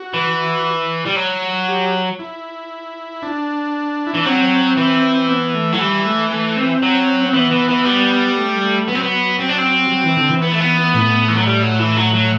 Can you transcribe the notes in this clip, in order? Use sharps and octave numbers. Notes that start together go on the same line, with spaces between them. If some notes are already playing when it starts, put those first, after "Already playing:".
Already playing: F#4
E3
G3
F#3
G4
E4
D4
E4
E3 D4
F#3 C4
E3
B3
A3
F#3
E3 G3
A3
A3
C4
F#3
C4
E3 B3
E3
E3
G3
A3
A3
F#3 B3
C4
B3
C4
D4
C4
F#3
E3
D3
E3
B3
A3
B3
A2
E3
F#3
G3
F#3
E3
F#3
F#3